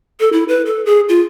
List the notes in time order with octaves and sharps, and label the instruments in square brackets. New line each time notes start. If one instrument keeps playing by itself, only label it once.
[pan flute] A4
E4
B4
A4
G#4
F4